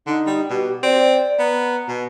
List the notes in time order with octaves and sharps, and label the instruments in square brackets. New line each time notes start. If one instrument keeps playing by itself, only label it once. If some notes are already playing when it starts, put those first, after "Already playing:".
[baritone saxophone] D3 [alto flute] D#4
[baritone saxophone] G3
[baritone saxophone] B2 [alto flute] G4
[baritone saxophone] C4 [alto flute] D5
[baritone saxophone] B3 [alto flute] A#5
[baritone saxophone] B2